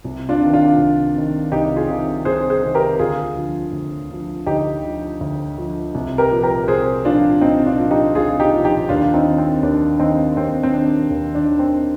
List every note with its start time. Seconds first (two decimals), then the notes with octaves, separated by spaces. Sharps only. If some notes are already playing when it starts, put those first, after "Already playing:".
0.04 C2
0.29 D4 F4
0.41 C3 D#3
0.53 D4 F4
0.78 C2
1.15 C3 D#3
1.52 C2 D#4 G4
1.76 F4 G#4
1.88 C3 D#3
2.25 C2 G#4 C5
2.50 G#4 C5
2.63 C3 D#3
2.75 G4 A#4
2.99 D2 F4 G#4
3.36 D3 F3
3.72 D2
4.10 D3 F3
4.47 D2 D#4 G4
4.83 D3 F3
5.21 D2
5.57 D3 F3
5.94 C2
6.18 G4 A#4
6.31 A#2 F3
6.43 G4 A#4
6.68 C2 G#4 C5
7.05 A#2 F3 D4 F4
7.41 C2 C4 D#4
7.66 D4 F4
7.78 A#2 F3
7.91 D#4 G4
8.15 C2 F4 G#4
8.40 D#4 G4
8.53 A#2 F3
8.65 D#4 G4
8.89 D#2 D4 F4
9.14 C4 D#4
9.26 D#3
9.38 C4
9.63 D#2 D4
9.99 D#3 C4 D#4
10.37 D#2 C4
10.63 C4
10.73 D#3 D4
11.10 D#2
11.35 D4
11.47 D#3
11.59 C4